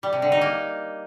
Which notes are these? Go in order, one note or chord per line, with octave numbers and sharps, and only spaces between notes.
G3
C3
D3
D#4
A#3